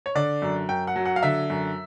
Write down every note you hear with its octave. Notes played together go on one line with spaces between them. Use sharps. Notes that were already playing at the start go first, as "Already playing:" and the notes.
C#5
D3 D5
F#2
F#2 G5
F#5
F#3
F#5
F5
D3 E5
F#2